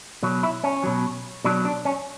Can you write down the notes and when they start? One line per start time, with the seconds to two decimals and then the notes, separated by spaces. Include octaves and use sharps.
0.23 B2 F#3
0.43 E4
0.64 C#4
0.84 B2 F#3
1.44 B2 F#3 D4
1.65 D4
1.85 C#4